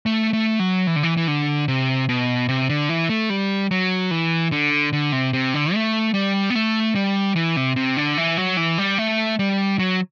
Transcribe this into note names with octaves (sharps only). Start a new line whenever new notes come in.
A3
A3
F#3
E3
D3
E3
E3
D3
C3
B2
C3
D3
E3
A3
G3
F#3
E3
D3
D3
C3
C3
D3
A3
G3
B3
A3
G3
E3
C3
C3
D3
E3
F#3
E3
G3
A3
G3
F#3